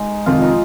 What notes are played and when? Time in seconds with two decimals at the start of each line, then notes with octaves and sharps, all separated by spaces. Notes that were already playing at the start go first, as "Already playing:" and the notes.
Already playing: G#3 D#4
0.26 F2 C3 D#3 F4
0.42 D#4